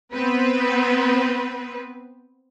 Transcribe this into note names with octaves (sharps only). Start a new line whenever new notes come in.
B3 C4 B4